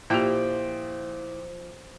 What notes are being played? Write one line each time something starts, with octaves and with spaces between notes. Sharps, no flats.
A#2 F3 A#3 E4 G4 G5